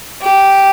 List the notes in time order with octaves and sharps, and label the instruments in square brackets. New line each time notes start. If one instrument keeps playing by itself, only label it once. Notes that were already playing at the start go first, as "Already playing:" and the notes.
[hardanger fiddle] G4